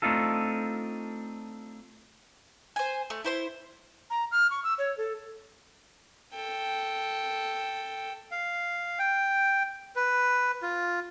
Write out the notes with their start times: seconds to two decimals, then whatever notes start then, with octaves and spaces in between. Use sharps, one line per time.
0.02 A3 C4 D4 D#4 F4 A4
2.76 C5 G#5
3.10 A3
3.24 E4 C5 C6
4.10 A#5
4.32 F6
4.51 C#6
4.64 E6
4.78 C#5
4.98 A4
6.35 A4 G5
8.31 F5
8.99 G5
9.96 B4
10.62 F4